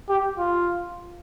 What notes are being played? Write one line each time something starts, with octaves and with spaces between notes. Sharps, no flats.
G4
F4